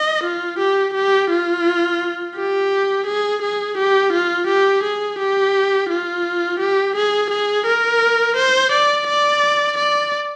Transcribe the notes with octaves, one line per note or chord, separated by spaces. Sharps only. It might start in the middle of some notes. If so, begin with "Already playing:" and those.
Already playing: D#5
F4
G4
G4
F4
G4
G#4
G#4
G4
F4
G4
G#4
G4
F4
G4
G#4
G#4
A#4
C5
D5
D5
D5